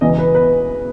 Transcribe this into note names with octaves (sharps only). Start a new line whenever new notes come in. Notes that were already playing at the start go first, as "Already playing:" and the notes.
E1 E2 C#3 E3 D#5
B4
B4